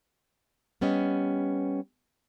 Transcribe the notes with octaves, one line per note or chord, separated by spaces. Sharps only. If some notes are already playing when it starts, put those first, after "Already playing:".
G3 B3 C#4 G4 D#5